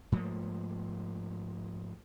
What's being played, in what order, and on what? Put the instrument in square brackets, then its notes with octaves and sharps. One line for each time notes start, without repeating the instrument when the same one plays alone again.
[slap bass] G#2 F3 A3 A#3